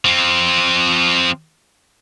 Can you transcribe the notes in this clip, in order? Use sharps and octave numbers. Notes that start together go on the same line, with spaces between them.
F3 C4